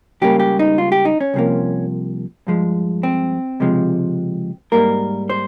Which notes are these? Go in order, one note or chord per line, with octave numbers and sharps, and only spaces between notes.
C#2 C#3 G3 A#3 G4
G4
D#4
F4
G4
D#4
C#4
C2 C3 F3 A#3
G2 F3 G#3
C4
C#2 C3 F3 G#3
G#2 G3 A#3 A#4
C5